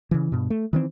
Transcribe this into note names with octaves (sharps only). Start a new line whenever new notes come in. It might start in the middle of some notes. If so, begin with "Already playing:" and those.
C#3 E3
G2 B2
A3
D#3 E3 C4